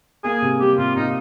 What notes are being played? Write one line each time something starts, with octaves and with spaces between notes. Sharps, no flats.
A#3 G#4
C3
G3 G4
C3 F4
A#2 D#4